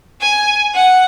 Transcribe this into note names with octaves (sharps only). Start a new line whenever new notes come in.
G#5
F#5